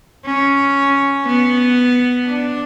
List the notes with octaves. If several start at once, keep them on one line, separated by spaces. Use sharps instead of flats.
C#4
B3
D4